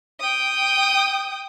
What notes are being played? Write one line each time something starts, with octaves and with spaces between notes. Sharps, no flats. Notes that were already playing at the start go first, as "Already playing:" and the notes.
G5 D#6